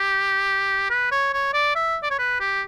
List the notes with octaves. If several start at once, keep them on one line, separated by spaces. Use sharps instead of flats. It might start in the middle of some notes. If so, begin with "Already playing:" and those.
Already playing: G4
B4
C#5
C#5
D5
E5
D5
C#5
B4
G4